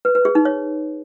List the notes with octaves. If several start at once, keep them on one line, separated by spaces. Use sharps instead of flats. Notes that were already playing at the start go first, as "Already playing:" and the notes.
B4
B4
G#4
D#4
C#5